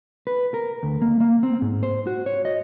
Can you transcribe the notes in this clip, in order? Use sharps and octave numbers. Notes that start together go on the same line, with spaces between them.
B4
A#4
D2
A#3
A#3
C4
G#2
C5
F#4
C#5
D#5